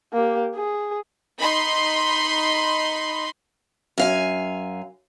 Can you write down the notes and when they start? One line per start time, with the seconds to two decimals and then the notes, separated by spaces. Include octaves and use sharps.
0.13 A#3 G4
0.55 G#4
1.39 D#4 B5 C6
3.98 F#2 F5 G#5